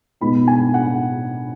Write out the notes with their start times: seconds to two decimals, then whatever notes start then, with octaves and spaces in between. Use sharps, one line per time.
0.21 B2 G#3 B3 D#4 B5
0.48 G#5
0.74 F#5